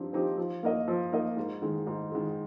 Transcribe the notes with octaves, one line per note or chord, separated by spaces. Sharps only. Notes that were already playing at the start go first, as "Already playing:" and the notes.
Already playing: G2 F3 C4 D#4 G4
F3 C4 D#4 G4
F3
A#3 D#4 A#4 D#5
F3
A#3 D#4 A#4 D#5
G#2
D#3 G#3
G#2
D#3 G#3